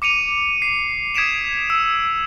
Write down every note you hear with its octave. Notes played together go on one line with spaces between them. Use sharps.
D6 C#7 D#7 F7
C7
D#6 G#6 B6 D7 E7 F7
E6